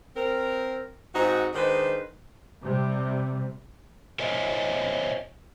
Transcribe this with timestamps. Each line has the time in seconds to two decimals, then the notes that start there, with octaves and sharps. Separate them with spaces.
0.16 C4 A#4
1.15 G#2 C4 D#4 F#4
1.54 D#3 G#3 D4 B4 C5
2.63 C3 G3
4.19 A#4 C5 C#5 D#5 E5 G#5